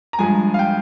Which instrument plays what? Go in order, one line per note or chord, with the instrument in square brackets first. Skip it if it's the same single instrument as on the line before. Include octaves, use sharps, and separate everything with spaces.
[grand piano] A#5
G2 F3 G#3 G#5
F5
G5